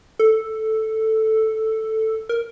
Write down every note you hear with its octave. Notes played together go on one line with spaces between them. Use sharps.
A4
A#4